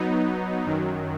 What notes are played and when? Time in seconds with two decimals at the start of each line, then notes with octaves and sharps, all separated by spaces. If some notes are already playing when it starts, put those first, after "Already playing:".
Already playing: F#3 B3 D#4
0.65 F#2 D#3 F#3